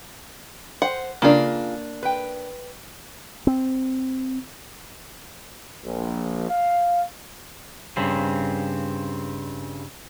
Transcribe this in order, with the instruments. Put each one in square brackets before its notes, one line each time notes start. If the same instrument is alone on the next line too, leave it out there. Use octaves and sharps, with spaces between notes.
[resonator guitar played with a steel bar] C5 [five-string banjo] F#5
[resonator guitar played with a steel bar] C#3 F4 A#4 [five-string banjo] A#3 D4
[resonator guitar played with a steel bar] B4 G5
[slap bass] C4
[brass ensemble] A#1
F5
[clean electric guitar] G2 C#3 C4